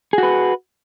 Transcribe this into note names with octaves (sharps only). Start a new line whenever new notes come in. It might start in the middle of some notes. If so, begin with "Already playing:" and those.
F#4 G#4 B4